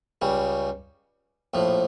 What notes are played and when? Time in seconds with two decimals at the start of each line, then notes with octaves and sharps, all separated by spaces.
0.22 C#2 C#3 G3
1.54 A#1 A2 F3